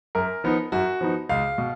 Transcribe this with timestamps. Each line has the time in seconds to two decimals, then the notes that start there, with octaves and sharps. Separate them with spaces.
0.15 F#2 A#4
0.44 F3 B3 D#4
0.72 F#2 F#4
1.01 F3 B3 D#4
1.29 C#2 F5
1.58 B2